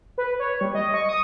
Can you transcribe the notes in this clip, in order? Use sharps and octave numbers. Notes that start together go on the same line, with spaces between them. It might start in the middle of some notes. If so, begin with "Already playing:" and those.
B4
C#5
G3
D#5
C#6
D#6